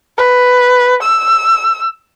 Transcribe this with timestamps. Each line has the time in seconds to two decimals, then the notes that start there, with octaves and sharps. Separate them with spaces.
0.18 B4
1.03 E6